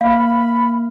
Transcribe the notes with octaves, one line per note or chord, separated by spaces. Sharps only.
A#3 F5 B5 F6